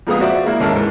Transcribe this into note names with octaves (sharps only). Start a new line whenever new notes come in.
F2 A#2 G#3 B3 F5 D#6
F#4 C5 D5 E5
G#3 A#3 E4
D#2 G#2 C#4 A#4 E5 A5
G#2 E3